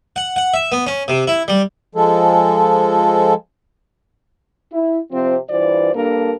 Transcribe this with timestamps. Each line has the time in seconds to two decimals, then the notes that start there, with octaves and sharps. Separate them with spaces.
0.16 F#5
0.36 F#5
0.54 E5
0.72 B3
0.87 C#4
1.08 C3
1.28 E4
1.48 G3
1.95 F3 G#3 A4
4.72 E4
5.12 C3 F3 C4
5.50 G2 E3 F4 C5 D5
5.94 G2 A#3 D4 A4 A#4